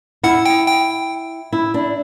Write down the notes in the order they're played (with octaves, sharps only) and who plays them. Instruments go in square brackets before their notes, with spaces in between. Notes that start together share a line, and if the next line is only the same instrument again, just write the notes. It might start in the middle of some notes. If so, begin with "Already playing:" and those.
[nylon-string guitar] E4 [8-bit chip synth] F#5
[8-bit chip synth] G5
G5
[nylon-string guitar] E4
D4